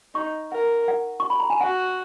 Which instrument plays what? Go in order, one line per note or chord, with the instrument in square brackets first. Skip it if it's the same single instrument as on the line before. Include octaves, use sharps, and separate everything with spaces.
[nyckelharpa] D#4 [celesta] C#6
[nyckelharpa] A#4 [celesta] F#5
[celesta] F#5
C#6
B5
A#5
G#5
[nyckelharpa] F#4 [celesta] F#5